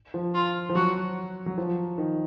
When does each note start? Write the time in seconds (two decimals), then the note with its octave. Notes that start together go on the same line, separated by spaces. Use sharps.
0.14 F3
0.35 F4
0.69 F3
0.75 F#3 F#4
1.46 F#3
1.58 F3
1.98 D#3